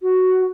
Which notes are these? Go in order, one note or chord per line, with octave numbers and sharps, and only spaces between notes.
F#4